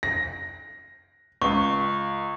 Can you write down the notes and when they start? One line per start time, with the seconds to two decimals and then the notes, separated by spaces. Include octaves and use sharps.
0.03 A#6
1.42 C#2 C#6